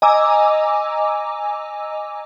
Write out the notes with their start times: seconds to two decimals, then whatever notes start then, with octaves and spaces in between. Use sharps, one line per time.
0.02 D#5 G#5 A#5 D6 E6